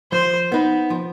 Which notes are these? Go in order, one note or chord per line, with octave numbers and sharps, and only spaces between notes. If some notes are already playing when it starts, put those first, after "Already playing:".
F3 C5
B3 D#4 B4
F3